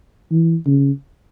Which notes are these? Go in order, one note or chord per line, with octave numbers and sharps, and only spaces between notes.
E3
C#3